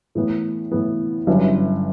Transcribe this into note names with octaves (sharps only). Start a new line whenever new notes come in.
A2 E3 B3
A2 E3 B3
G1 G2 F#3 C#4 E4